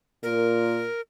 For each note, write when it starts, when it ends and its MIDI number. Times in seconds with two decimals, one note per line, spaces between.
0.23 0.86 46
0.23 1.01 70